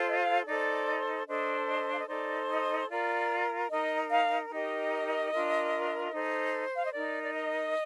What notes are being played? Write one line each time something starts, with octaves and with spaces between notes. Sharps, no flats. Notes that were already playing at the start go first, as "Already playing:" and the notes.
Already playing: F4 A4 C5
D#5
F5
D#4 A4 C5 D5
D4 A4 C5 D#5
D#5
F5
D#5
D#4 A4 C5 D5
D#5
F4 A#4 D5
D#4 A#4 D#5
F5
D#4 G4 A#4 D#5
D4 F4 A#4
D#4 A4 C5
F5
D#5
D#4 A#4 D5
D5
D#5